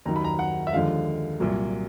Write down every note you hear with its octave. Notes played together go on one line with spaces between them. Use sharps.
D#2 D#3 F#3 A#5
B5
A#5
F#5
E5
D#2 D3 F3 G#3 F5
C2 A#2 F#3